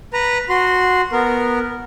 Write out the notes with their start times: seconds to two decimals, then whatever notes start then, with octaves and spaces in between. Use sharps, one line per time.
0.13 B4 A#5
0.50 F#4 C6
1.12 B3 A#4